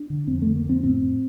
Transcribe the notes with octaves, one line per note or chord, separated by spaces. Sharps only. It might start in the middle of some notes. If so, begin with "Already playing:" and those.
Already playing: D4
D3
F2 C4
D3 A3
A#3
F2 C4
A2 C4
A2